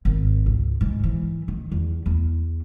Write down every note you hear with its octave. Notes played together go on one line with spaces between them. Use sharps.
G#1
C#2
G#2
E3
D#3
E2
E2